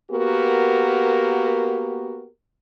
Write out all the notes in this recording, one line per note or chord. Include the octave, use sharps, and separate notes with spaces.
A#3 B3 F#4 G4 A#4